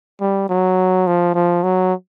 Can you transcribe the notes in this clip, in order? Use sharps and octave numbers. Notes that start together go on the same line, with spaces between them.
G3
F#3
F3
F3
F#3